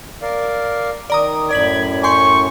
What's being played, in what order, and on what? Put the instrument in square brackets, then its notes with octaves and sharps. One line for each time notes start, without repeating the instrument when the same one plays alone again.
[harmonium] A#4 D5 F5
[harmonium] D#3 [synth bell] D5 A#5 D#6
[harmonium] F#2 A2 [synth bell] D5 B6 F#7 [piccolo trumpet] G#6
[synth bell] G#5 C6 G6 [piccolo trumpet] C#6